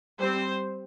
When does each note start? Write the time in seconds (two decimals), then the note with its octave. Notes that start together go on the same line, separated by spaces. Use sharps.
0.19 G3 C4 C5